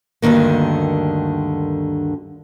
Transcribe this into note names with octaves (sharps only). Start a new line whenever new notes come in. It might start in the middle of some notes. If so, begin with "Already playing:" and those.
D2 G2 D3 D#3 A#3